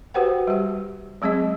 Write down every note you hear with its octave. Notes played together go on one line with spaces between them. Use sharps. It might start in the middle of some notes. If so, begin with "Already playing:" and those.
F#4 G4 B4 C5 F#5 G5
G3 G4
F#3 G#3 C4 G#4 D#5